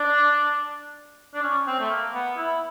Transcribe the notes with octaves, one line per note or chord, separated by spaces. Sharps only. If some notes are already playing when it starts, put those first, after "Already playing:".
Already playing: D4
D4
C#4
C4
A3
A#3
B3
E4